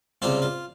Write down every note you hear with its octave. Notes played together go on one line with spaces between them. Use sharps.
C#2 C3 G3 C4 F4
F4